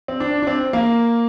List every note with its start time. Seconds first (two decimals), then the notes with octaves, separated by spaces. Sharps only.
0.08 C4
0.20 D4
0.43 D4
0.47 C4
0.73 A#3